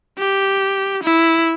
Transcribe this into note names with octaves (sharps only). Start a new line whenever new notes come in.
G4
E4